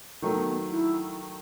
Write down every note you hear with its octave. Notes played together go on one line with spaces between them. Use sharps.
D#3 F#3 A3
B3
B3
E4